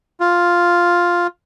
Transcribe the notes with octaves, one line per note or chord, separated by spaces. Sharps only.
F4